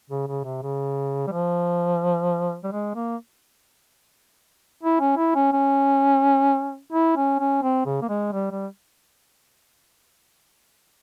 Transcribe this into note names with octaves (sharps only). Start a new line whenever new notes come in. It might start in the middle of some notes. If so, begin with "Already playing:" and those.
C#3
C#3
C3
C#3
G3
F3
G3
G#3
A#3
E4
C#4
E4
C#4
C#4
E4
C#4
C#4
C4
C#3
A#3
G#3
G3
G3